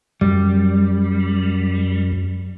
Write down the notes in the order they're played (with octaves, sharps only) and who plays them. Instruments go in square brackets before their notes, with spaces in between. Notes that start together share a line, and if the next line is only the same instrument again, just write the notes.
[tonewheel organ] F#2 [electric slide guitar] G3